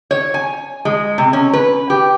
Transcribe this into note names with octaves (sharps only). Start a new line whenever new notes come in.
C#5
G#5
G#3
C3
C#4
B4
G4